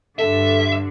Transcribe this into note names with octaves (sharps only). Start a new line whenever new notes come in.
G2 D3 A4 E5